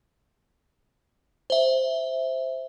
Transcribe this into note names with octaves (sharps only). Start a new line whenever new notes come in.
C5 E5